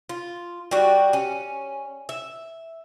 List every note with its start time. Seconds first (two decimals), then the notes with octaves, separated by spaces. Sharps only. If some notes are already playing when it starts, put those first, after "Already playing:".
0.09 F4
0.71 G3 F#4
1.13 C#4
2.09 E5